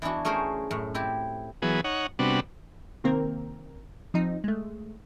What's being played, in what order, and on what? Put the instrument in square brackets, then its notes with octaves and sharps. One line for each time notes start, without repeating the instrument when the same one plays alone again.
[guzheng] E3 B3 D4 E4 F#4
A3 C#4 G#4 A#4 C5 C#5
F#2 A2
C4 E4 G4
[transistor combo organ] E3 F#3 B3 G#4
D#4 C#5 F#5
C3 G3 B3 D4 F#4
[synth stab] C3 D#3 A#3 C4 A#4
F3 C4 D#4
G#3 A3